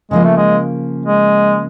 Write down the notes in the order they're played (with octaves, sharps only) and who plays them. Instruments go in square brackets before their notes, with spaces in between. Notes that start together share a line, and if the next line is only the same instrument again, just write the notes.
[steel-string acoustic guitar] C#3 F3 A#3 [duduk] G#3
[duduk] A3
G#3
G#3